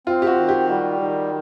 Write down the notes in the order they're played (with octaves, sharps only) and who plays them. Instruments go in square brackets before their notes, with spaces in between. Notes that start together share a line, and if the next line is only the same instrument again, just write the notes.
[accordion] C4 [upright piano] F4
[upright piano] G4
F#4
[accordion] D#3
[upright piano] G4
[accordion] G3 [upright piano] F#4
[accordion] D#3